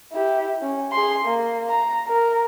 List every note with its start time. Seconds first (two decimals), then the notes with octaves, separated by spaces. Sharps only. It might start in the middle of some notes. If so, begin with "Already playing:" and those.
0.12 E4 G4
0.62 C#4
0.92 G#4 C6
1.24 A#3
1.69 A#5
2.08 A#4